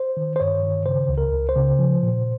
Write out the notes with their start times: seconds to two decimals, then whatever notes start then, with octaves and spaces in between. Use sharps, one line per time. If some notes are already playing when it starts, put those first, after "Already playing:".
Already playing: C5
0.17 D#3
0.36 C5
0.40 G2 C#5
0.63 D#3
0.86 C#3 C5
1.09 C#2
1.18 A#4
1.33 C#2
1.49 C5
1.56 C#3
1.79 F3
2.03 A#2